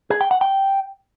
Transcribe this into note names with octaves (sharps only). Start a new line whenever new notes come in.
G#4
G5
F#5
G5